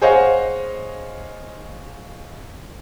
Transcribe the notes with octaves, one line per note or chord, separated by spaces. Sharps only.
G#4 C5 C#5 D#5 F5 F#5